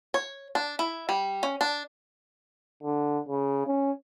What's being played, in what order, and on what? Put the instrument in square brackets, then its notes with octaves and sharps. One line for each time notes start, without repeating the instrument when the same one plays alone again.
[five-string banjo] C#5
D4
E4
G3
C#4
D4
[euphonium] D3
C#3
C#4